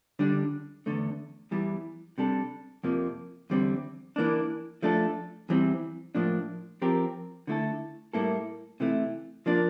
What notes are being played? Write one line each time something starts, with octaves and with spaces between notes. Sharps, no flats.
D3 G3 D4
E2 D3 A3
E2 E3 G3
C3 G3 D4 A4
F2 C3 F3 A#3
E2 D3 G3 C4
E3 A#3 D4
F3 A3 D4 A4
E2 E3 G3 C4
A2 F3 A#3 D4
F3 C4 G4 A#4
D3 A3 E4 A4
A2 G3 A#3 E4 A4
C3 E3 A3 E4
F3 A#3 D4